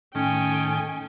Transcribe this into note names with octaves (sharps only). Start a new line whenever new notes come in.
A2 D#3 C#4 G5 G#5